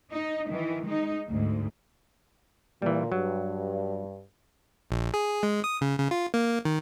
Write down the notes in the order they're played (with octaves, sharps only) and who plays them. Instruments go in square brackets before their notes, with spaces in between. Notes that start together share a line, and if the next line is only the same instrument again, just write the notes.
[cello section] D#4
D#3 E3
G#3 D#4
D2 G#2
[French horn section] A#2 [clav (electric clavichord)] E3 G3
[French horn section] G2 [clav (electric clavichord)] F#3
[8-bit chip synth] A#1
G#4
G#3
D#6
C#3
C#3
F4
A#3
D#3